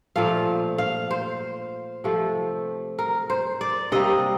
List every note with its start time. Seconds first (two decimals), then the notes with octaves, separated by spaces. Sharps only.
0.16 A#2 F3 A3 F5
0.78 F5
1.11 C5
2.04 C3 F3 A3
2.99 A#4
3.30 C5
3.61 D5
3.92 C3 G3 A#3 D#5